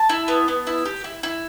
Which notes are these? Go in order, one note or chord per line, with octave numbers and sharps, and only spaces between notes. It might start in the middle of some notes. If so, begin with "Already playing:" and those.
Already playing: A5
E4
B3
B3
E4
G4
E4
E4